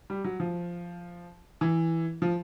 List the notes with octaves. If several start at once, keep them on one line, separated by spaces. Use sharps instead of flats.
G3
F#3
F3
E3
F3